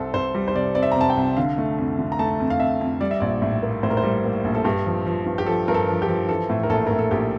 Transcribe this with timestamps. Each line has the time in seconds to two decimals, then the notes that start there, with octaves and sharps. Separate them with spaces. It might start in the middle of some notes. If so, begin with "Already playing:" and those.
Already playing: C2 C4 A4
0.14 C2 C5
0.35 G3
0.48 C5
0.55 C3 D5
0.75 C4 D5
0.83 E5
0.92 A#5
0.96 C3 A5
1.10 G5
1.17 C2
1.37 D3 F5
1.58 A3
1.78 F2
1.99 D3
2.12 A#5
2.19 A3 A5
2.40 F2
2.50 F5
2.60 F2 E5
2.81 F2
3.01 G3 D5
3.11 E5
3.20 A#1 D5
3.42 A2
3.63 A#3
3.83 A2 C5
3.90 A#4
3.97 C5
4.03 G3
4.24 A#3
4.44 A#1
4.55 A4
4.64 G2 G4
4.86 F3
5.06 F3
5.26 G2
5.38 G4
5.46 F3 A4
5.68 G2 A#4
5.74 A4
5.88 F3
6.02 G4
6.09 F3
6.29 E3 A4
6.49 A2
6.63 A#4
6.69 A#1 A4
6.87 A2 A#4
6.99 A4
7.11 A#1 G4